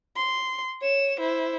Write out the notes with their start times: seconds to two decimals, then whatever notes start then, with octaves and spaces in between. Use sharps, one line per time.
0.17 C6
0.82 C#5 E7
1.20 E4 C5